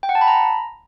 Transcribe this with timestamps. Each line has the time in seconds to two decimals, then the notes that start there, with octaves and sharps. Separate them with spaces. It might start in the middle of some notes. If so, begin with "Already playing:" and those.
0.03 G5
0.09 F#5
0.15 A5
0.21 B5
0.27 A#5